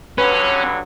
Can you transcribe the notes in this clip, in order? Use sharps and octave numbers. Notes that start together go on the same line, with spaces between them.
G2 D3 F#3 C#4 B4